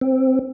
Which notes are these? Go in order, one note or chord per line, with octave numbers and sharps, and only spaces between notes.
C4